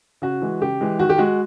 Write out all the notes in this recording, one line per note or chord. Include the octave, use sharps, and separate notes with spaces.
C#3 F#4
E3 G#3
C#3 G4
E3 G#3
D#3 F#4
G4
G#3 F#4